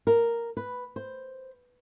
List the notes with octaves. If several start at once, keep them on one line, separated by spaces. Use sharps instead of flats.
A#4
B4
C5